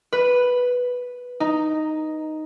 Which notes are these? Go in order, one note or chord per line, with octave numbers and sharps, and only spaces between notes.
B4
D#4